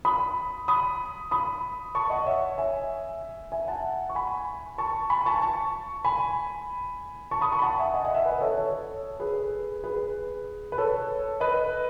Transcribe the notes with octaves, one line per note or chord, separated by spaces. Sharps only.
B5 D#6
B5 D#6
B5 D#6
A5 C#6
D#5 F#5
C#5 E5
E5 G#5
E5 G#5
F#5 A5
C#6
G#5 B5
A5 C#6
G#5 B5
A5 C#6
A5 C#6
G#5 B5
A5 C#6
B5 D#6
A5 C#6
B5
F#5 A5
E5 G#5
D#5 F#5
D#5 F#5
E5 G#5
B4 D#5
A4 C#5
A4 C#5
G#4 B4
G#4 B4
B4
A4 C#5
B4 D#5